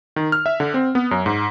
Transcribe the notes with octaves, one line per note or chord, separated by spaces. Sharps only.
D#3
F6
E5
D3
C4
B3
F#2
G#2